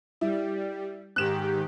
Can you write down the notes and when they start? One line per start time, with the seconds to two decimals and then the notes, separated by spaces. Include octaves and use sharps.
0.21 G3 E4
1.16 G#2 D#3 G4 F#6 E7